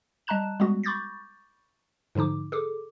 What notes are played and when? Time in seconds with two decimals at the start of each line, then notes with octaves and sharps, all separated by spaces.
0.27 G3 D#5 A5 A#5 F#6 E7
0.60 G3 G#3 B3 F#4
0.83 B5 C#6 D6 G6 A6 A#6
2.15 G#2 D3 F3 D#4 D6
2.52 G#4 A4 D6